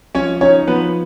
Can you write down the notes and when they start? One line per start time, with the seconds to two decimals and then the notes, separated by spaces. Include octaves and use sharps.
0.15 F3 C#4 C#5
0.41 C#4 D#4 C#5
0.68 F3 B3 B4